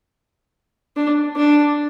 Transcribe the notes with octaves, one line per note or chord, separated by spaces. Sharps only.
D4
D4